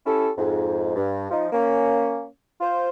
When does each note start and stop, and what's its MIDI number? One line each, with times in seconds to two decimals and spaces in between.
0.05 0.30 61
0.05 0.30 64
0.05 0.30 67
0.05 0.30 69
0.37 0.95 41
0.37 0.95 44
0.96 1.28 43
1.31 1.47 53
1.31 1.47 63
1.52 2.25 58
1.52 2.25 61
2.61 2.89 65
2.61 2.89 72